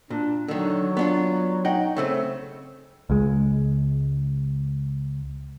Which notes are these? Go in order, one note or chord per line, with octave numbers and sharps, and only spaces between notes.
A#2 D4
D3 D#3 F#3
B3 D4 F4
D#4 F#5 G5
C#3 A3 C4
C#2 G#3